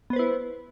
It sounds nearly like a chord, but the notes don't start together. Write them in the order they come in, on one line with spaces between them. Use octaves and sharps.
B3 C5 B4 E4